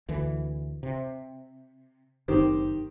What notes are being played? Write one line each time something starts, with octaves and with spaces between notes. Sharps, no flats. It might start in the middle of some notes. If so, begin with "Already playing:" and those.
D2 E3
C3
F#1 C3 D#3 C4 G4 C5